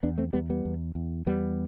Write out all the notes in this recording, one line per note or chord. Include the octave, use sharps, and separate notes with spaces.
E2 B3 D4
A3 C4
E2 G3 B3
G3 B3
E2
E2
E2 G3 B3